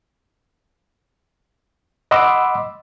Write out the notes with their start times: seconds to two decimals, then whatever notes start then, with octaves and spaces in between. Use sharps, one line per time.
2.11 D#5 F#5 B5 C6 D6 E6